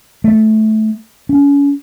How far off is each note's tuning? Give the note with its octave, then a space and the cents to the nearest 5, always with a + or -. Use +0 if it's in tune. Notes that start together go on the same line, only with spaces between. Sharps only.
A3 -15
C#4 +35